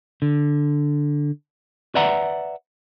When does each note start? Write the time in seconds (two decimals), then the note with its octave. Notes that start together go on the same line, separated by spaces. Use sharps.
0.22 D3
1.95 B4 D5 E5 F#5 A#5